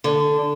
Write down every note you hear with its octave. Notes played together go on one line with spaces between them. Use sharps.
D3